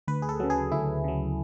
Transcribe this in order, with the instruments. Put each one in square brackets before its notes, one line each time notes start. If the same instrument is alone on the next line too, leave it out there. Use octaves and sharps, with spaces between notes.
[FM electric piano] D2 B4
G#4
A4
C#3 F#3
G#4
D2 E4
C#3 F#3